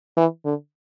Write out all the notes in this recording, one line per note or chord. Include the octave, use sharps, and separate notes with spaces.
E3
D3